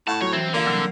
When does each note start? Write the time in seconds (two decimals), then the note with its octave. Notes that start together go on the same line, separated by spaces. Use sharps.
0.08 A2 F#5 A5 C#6
0.22 F#3 C#5
0.33 G2 E3 C4
0.54 D3 A#3 F4 D5
0.66 C2 F#3 E6